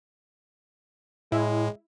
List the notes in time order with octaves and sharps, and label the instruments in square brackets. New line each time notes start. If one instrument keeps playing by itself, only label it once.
[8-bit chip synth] A2 [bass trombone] G#3 [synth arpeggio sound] E4